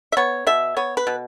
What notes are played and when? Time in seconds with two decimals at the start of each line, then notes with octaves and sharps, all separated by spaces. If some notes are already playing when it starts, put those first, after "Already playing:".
0.12 E5
0.17 B3 C#5
0.47 B2 E5
0.77 B3 C#5
0.97 B4
1.07 B2